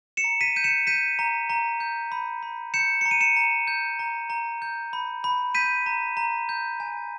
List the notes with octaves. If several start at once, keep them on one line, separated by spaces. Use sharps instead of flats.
C#7 E7
A#5
B6 D#7
G6 D#7
C#7 E7
G6 B6 D#7
A#5
A#5
G6
B5
B5
G6 C#7 E7
A#5 C#7
D#7
C#7 E7
A#5
G6
A#5
A#5
G6
B5
B5
G6 B6 D#7
A#5
A#5
G6
G#5